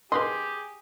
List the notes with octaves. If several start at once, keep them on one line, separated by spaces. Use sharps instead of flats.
G4 G#4 A#4 B4 D#5 C6